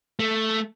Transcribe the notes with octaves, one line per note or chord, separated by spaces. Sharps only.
A3